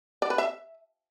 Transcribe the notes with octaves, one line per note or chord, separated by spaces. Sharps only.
D5
B4
E5